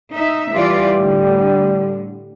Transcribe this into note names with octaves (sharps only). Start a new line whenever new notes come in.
D#4 E5
E3 G3 F4 D5
A2 D3